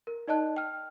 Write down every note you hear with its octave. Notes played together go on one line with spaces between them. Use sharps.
A#4
D#4 D5 D#5 A5 F#6
G5 F6